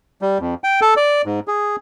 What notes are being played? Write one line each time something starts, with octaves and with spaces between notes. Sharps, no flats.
G3
F2
G5
A4
D5
G#2
G#4